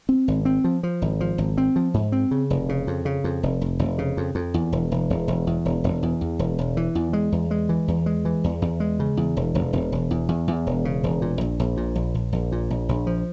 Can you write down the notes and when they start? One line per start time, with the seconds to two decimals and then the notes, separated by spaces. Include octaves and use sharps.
0.09 C4
0.28 G#1
0.45 C4
0.64 F3
0.83 F3
1.02 G#1
1.20 F3
1.38 G#1
1.58 C4
1.76 F3
1.94 G#2
2.12 C4
2.31 C#3
2.50 F1
2.69 C#3
2.87 F2
3.05 C#3
3.24 F2
3.43 F1
3.61 F1
3.79 F1
3.98 C#3
4.17 F2
4.35 F2
4.54 E2
4.72 E1
4.91 E1
5.10 E1
5.28 E1
5.47 E2
5.65 E1
5.84 E1
6.03 E2
6.21 E2
6.39 E1
6.58 E1
6.77 E3
6.95 E2
7.13 G#3
7.32 E2
7.51 G#3
7.69 E3
7.88 E2
8.06 G#3
8.25 E3
8.44 E2
8.62 E2
8.80 G#3
9.00 C#3
9.17 E2
9.37 E1
9.55 E1
9.73 E1
9.92 E1
10.11 E2
10.29 E2
10.48 E2
10.67 E1
10.85 C#3
11.04 E1
11.22 A#2
11.41 A#1
11.59 A#1
11.77 A#2
11.95 A#1
12.15 A#1
12.33 A#1
12.52 A#2
12.70 A#1
12.89 A#1
13.07 F3